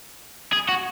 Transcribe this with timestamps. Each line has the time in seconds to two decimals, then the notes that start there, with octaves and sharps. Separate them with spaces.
0.53 G#4
0.69 F#4